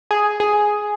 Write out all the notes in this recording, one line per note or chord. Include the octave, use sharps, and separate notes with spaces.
G#4
G#4